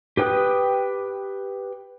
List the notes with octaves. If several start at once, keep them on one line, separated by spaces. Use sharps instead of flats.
G4 B4 G5 D#6 F#6